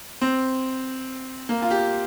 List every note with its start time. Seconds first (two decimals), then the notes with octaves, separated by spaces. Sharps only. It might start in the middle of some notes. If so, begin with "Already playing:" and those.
0.21 C4
1.49 A#3
1.62 F4
1.71 G4